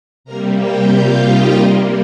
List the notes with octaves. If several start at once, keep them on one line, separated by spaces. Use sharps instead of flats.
C3 G3 A#3 A#4 A#5
G4 G5
F4 F5
D#4 D#5
C3 G3 A#3 C5